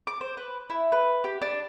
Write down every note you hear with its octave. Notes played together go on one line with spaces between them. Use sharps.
D6
C5
B4
E4
B4
G4
D4